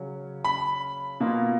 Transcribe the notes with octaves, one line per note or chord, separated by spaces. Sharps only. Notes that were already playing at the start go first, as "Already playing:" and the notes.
Already playing: C#3 F#3 C#4
B5
B2 A#3 F4